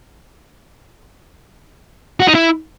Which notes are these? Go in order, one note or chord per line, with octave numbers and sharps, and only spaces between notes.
F#4
D#4
E4